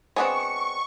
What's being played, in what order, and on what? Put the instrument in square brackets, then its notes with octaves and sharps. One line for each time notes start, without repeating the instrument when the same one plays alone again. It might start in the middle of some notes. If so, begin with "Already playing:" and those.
[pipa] G#3 B3 F#4 [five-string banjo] C4 D4 C#5 [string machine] C#6